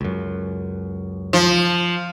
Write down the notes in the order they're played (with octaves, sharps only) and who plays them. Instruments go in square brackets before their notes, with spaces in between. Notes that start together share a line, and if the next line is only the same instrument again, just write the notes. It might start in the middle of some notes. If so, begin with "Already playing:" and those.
[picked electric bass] C#2 F#2
[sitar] F3